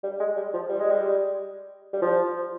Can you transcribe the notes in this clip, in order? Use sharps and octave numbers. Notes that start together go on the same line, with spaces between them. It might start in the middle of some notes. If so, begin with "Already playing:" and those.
G3
G#3
G3
F3
G3
G#3
G3
G3
F3